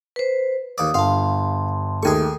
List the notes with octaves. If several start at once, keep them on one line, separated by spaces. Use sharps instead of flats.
B4 C5
D#2 D5 D#6
G1 F5 A5 C6
D#2 A3 G#4 G#5 C#6